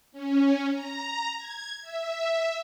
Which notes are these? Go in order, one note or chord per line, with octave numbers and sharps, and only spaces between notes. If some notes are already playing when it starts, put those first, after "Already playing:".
C#4
A#5
G#6
E5